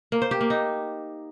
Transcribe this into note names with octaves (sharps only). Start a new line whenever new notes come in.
A#3
C5
G4
A#3
D#4